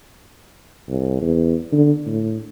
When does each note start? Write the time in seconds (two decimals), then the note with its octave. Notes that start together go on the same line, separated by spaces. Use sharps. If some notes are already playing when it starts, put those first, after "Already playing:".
0.88 C2
1.22 E2
1.72 D3
2.06 A2